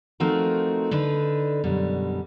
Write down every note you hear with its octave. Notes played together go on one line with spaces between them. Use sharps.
F3 A3 C4 D#4 F#4 A#4
D3 D4 D#4 B4
F#2 B2 D3 G3